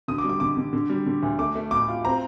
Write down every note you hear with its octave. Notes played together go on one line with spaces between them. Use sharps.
D3 D#6
D6
G3
D6
D3 D6
D3
D3
G3
D3
D2
A3 D6
A3
A2 D6
F4
C4 A#5